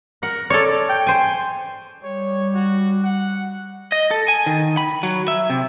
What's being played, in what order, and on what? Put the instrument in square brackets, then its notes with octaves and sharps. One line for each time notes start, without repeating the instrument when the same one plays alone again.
[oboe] A#4 [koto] F#5
[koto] A4 C#5 [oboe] D5
[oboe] G5
[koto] C5 G#5
[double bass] G3 [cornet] C#5
[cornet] F#4
F#5
[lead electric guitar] D#5
A4
G#5
D#3
B5
F#3
E5
C3